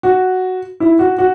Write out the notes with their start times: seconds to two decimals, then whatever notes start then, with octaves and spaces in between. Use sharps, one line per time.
0.03 F#4
0.80 E4
0.99 F#4
1.18 F#4